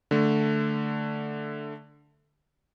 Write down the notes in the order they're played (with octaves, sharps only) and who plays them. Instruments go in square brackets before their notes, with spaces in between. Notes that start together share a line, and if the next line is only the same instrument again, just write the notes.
[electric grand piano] D3 A3